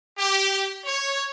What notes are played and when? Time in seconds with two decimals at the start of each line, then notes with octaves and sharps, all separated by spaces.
0.17 G4
0.85 C#5